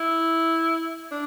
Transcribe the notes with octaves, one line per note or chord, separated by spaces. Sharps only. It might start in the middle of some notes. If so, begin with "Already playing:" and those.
Already playing: E4
D4